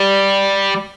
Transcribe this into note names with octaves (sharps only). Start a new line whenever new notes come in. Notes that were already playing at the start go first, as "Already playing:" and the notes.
Already playing: G3